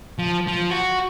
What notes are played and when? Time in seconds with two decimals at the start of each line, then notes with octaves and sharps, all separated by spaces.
0.19 F3
0.47 F3
0.71 F#4